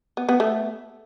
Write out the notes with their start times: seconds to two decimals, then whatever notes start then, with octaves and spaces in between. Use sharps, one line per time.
0.17 B3
0.29 B3
0.40 A3